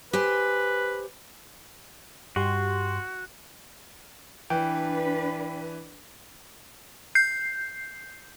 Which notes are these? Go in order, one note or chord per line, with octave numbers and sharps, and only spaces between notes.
G4 B4 C5 G#5
G2 F#4 G4 C6
E3 D4 B4 G5
G6 C7